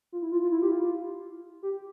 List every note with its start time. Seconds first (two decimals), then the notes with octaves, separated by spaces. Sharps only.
0.12 F4
0.22 E4
0.32 F4
0.42 F4
0.52 E4
0.62 G4
0.72 F4
1.63 G4